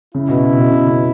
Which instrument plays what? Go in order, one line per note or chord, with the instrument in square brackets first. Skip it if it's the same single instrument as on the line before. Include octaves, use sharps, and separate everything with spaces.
[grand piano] C#3 [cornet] E4
[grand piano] B2
B2
C#3
C#3